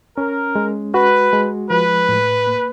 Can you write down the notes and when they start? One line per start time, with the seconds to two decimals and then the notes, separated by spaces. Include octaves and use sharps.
0.17 C#4 A#4
0.56 G#3
0.94 F#4 B4
1.33 G#3
1.70 F3 B4
2.09 A2
2.47 A#3